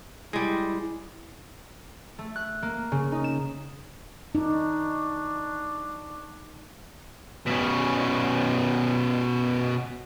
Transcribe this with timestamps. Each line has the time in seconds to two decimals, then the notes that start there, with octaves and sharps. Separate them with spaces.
0.33 G3 G#3 E4
2.19 A3
2.36 F#6
2.62 A#3
2.92 C#3
3.12 D#4
3.24 E7
4.35 D4 D#4 C#6
7.46 B2 C#4